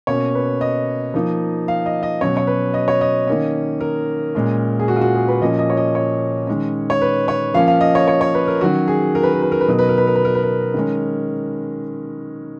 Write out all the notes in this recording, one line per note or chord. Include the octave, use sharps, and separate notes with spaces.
B2 A#3 C#4 C#5
B4
D#5
F3 A#3 D#4
F5
D#5
D#5
B2 F#3 C#4 C#5
C#5
B4
D#5
C#5
D#5
D#3 A#3 C#4
A#4
A#2 G#3 C#4
G#4
F#4
F4
F#4
G#4
B4
A#2 F3 A#3 C#4 D#5
D#5
C#5
D#5
C#5
D#3 G#3 C#4
C#5
B4
C#5
F3 A#3 C#4 F5
F5
D#5
C#5
C#5
C#5
B4
A#4
D#3 F#3 C#4 F#4
G#4
A#4
B4
A#4
B4
A#4
B4
B2 F#3 B3 D#4 A#4
B4
A#4
B4
A#4
B4
A#4
B4
A#4
D#3 G#3 C#4